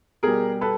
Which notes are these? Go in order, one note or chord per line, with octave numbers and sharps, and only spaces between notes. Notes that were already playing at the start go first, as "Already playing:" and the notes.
B2 G3 G#4 A#4
A4 B4